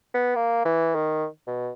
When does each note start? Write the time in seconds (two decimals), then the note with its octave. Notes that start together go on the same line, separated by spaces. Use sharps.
0.14 B3
0.36 A#3
0.65 E3
0.95 D#3
1.47 B2